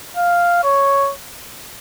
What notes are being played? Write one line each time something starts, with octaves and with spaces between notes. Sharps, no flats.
F5
C#5